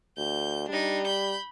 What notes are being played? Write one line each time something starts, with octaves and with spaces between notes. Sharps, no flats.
D2 G6
G3 D4 D#4
B5 G6